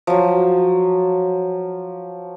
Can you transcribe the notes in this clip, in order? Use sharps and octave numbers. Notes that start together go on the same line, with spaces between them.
F3 F#3